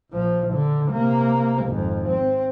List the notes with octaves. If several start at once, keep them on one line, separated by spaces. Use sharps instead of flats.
A#1 F3
D3
C3 A#3
G#1 F2
C4